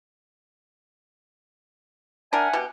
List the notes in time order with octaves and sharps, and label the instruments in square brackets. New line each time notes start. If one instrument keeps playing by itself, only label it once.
[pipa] D4 A#4 [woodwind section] E5 F#5 G#5
[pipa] B2 G4